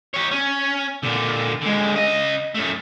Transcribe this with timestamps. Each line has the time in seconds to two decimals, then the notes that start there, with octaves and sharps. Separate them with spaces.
0.14 G4 C#5
0.31 C#4
1.03 A#2 D3
1.62 D3 G#3
1.96 C#3 D#5
2.55 F#2 A3